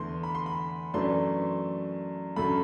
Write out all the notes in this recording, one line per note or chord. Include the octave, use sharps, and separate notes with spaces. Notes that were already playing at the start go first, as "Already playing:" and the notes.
Already playing: E2 D3 A3 C6
B5
C6
B5
F#2 E3 A3 D4 C6
F#2 D3 A3 B5